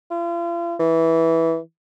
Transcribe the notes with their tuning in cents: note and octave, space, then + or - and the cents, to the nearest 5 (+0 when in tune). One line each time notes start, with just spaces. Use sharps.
F4 -40
E3 -10